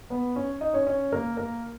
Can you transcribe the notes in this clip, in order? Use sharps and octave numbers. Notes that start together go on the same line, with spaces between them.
B3 B4
C#4 C#5
D#4 D#5
C#4 C#5
C#4 C#5
A#3 A#4
A#3 A#4